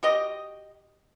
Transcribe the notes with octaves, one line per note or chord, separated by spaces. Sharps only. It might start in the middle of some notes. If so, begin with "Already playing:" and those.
F#4 G4 D#5